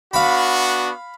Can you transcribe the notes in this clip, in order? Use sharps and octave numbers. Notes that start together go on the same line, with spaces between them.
B3 D4 F#4 F5 B5